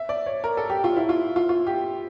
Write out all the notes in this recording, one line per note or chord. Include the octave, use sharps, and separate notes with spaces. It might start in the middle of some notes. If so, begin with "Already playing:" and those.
Already playing: E5
D5
C#5
A#4
A4
G4
F4
E4
F4
F4
F4
G4